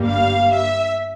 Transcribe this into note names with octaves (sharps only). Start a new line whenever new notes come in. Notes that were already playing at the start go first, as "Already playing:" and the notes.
Already playing: G1 G2 G3 A#3
F5
E5